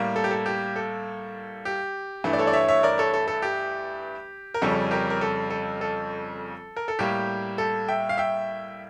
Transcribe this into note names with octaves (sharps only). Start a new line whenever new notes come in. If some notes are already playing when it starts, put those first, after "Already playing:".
Already playing: A2 G3 A#3
A4
G4
A4
G4
A4
G4
G2 E3 A3
D5
A4 C#5
D5
C#5 E5
C#5 E5
A#4 D5
A4 C#5
A4
A4
G4
A#4
F2 C#3 G3 C#4 A4
G4 A#4
A#4
A4
A4
A4
A#4
A4
A2 G3 A#3 G4
A4
E5 G5
F5
E5 G5